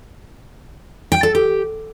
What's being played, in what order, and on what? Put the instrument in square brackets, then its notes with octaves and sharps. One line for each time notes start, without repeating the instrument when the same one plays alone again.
[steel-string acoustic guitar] G5
A4
G4